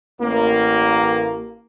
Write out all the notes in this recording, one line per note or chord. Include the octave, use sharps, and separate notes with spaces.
A1 A#3